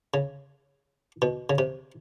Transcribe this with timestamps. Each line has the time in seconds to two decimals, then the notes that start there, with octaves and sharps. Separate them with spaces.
0.14 C#3
1.22 B2
1.50 C#3
1.58 C3